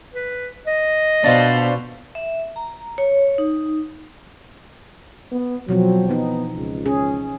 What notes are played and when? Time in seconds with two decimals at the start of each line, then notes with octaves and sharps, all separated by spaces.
0.14 B4
0.67 D#5
1.24 B2 D4 F4 C5
2.15 E5
2.56 A#5
2.98 C#5
3.38 D#4
5.32 B3
5.69 B2 F3 F#3 C4
6.09 E3 B3 D#4
6.57 C#2
6.86 C#4 G#4